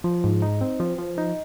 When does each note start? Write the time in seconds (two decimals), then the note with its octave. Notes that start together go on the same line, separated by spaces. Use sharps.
0.04 F3
0.24 G#2
0.42 D#4
0.61 C4
0.80 F3
0.98 F3
1.18 D#4